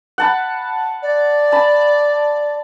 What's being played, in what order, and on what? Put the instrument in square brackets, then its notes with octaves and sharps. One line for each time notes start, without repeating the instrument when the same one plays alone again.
[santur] F#5 A5 B5
[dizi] D5
[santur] A5 B5